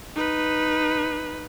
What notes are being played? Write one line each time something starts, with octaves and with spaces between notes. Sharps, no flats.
D#4 B4